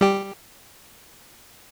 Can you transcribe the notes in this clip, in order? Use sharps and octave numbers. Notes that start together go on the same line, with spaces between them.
G3 G4